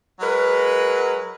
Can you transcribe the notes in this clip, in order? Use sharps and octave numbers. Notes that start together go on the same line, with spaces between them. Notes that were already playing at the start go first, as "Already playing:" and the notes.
F#3 G#3 A#4 B4